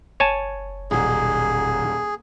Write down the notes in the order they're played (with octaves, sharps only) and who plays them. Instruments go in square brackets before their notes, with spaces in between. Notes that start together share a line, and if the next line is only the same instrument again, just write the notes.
[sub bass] F#1 [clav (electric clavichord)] C#5 G#5 A5
[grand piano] D#1 B1 [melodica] G#4